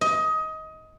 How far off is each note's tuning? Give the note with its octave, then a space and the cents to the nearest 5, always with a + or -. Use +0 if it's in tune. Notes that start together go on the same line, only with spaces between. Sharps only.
D#5 +20